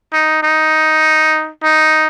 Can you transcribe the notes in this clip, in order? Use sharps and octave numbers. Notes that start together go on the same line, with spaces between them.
D#4
D#4
D#4